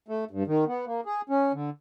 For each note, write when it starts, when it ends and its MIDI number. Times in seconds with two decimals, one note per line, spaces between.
0.08 0.25 57
0.31 0.43 43
0.47 0.65 51
0.67 0.85 59
0.87 1.01 58
1.06 1.21 68
1.30 1.52 61
1.53 1.70 50